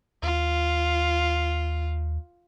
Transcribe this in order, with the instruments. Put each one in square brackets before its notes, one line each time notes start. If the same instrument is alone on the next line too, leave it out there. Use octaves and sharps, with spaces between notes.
[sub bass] D#2 [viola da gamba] F4